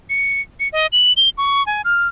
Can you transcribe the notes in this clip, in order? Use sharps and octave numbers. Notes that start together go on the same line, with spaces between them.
C#7
C#7
D#5
F#7
G7
C#6
G#5
F6